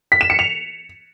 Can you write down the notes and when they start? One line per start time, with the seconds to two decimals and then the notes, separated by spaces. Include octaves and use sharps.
0.12 B6
0.21 E7
0.30 C#7
0.39 F7